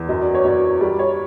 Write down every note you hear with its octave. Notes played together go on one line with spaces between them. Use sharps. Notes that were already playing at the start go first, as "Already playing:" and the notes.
Already playing: E2
F#2 D#5
D5
C#5
F#2 D5
G3 D5
C#5